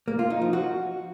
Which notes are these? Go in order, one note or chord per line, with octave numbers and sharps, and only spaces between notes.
A#3
F4
D#4
F3
F#4